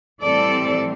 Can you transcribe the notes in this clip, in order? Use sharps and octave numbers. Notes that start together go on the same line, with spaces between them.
A2 E3 G3 C4 A4 D5